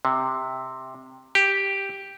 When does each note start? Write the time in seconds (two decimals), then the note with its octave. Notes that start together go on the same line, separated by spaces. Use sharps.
0.05 C3
1.35 G4